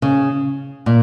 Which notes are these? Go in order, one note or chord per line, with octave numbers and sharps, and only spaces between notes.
C#3
A#2